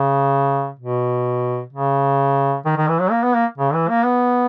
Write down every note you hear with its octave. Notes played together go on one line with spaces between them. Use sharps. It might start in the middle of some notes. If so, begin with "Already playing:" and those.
Already playing: C#3
B2
C#3
D#3
D#3
E3
F#3
A#3
B3
A#3
C#3
E3
A#3
B3